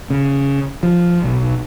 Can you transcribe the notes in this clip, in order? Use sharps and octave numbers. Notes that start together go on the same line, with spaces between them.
C#3
F3
B1